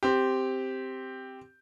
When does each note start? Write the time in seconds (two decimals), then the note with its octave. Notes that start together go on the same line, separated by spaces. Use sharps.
0.03 C4 G4